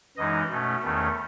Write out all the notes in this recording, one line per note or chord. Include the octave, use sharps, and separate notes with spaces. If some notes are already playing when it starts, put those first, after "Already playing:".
F#2 E3 G#3 D#4 D#5
B2 A3 C#4
E2 D#3 A3 C#4